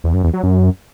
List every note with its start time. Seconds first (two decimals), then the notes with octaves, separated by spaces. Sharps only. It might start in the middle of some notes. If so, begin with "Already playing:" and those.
0.04 E2
0.14 F#2
0.24 E2
0.33 F#3
0.43 F#2